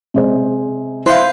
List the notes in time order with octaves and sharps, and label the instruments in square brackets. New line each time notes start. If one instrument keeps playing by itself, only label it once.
[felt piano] C3 G#3 C5
[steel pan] E4 C5 C6 [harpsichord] B4 F5